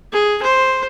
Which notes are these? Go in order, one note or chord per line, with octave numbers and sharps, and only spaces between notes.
G#4
C5